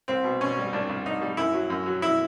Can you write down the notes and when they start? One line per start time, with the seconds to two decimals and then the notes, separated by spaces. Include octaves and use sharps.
0.08 C2 C4
0.24 B2
0.41 B2 C#4
0.57 G3
0.73 C2 D4
0.89 C2
1.05 C2 D#4
1.21 G3
1.37 F#2 E4
1.53 F#3
1.70 F#2
1.86 F#3
2.02 E4